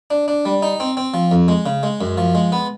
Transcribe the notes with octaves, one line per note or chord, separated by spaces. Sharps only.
D4
D4
G3
D#4
C4
C4
F3
F2
G#3
C#3
G#3
F#2
F3
G#3
B3